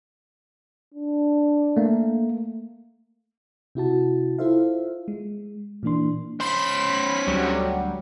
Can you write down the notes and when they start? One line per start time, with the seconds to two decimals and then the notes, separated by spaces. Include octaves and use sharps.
0.94 D4
1.77 A3 A#3
3.75 C3 E4 F#4 A5
4.38 E4 F4 A4 C5 E5 F5
5.08 G#3
5.83 A#2 E3 A#3 D4 C6
6.40 C#4 C5 B5 B6
7.27 D2 F#3 G3